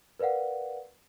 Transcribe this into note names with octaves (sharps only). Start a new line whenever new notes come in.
A#4 B4 D5 F5 F#5